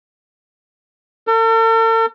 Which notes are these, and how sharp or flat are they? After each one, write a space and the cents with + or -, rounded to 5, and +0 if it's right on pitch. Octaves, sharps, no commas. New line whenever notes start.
A4 +45